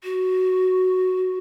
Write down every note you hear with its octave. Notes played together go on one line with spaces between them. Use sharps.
F#4